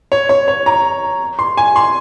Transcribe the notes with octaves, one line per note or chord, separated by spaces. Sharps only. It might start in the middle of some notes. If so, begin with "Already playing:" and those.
C#5
C#5
C#5
A#5
C6
G#5
C6